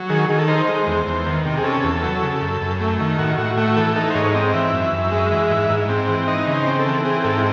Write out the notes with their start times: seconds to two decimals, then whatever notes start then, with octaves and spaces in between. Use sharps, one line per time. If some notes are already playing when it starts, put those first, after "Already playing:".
Already playing: F#3
0.09 D#3 G#4
0.28 D#3 G#4
0.38 A4
0.48 D#4 C5
0.68 G#3
0.87 E2
1.06 E2
1.26 D#3
1.45 C3
1.57 G#4
1.64 C#4 A4
1.83 E2
2.03 F#3
2.22 C#3
2.41 F#2
2.61 F#2
2.80 A3
3.00 D#3
3.18 A2 F#4
3.37 A2 F#4
3.57 A3 F#4
3.76 E3 A4
3.96 D#4 A4
4.10 C5
4.15 G#2 C#5
4.34 C4 D#5
4.54 E3 E5
4.73 F#2
4.92 F#2
5.11 G#3
5.31 E3
5.50 G#2
5.70 G#2
5.89 C4
6.08 E3
6.27 D#4 D#5
6.47 C#3
6.53 C5
6.66 C4
6.79 A4
6.85 E3
7.05 C4 G#4
7.24 G#2 A4
7.38 E4